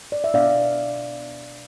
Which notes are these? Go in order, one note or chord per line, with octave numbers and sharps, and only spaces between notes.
D5
E5
B2 B3 D4 D5 F5